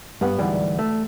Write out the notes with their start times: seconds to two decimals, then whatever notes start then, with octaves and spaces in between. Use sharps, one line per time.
0.21 G2 B3 F#5
0.38 D2 G#2 E3 G3
0.79 A3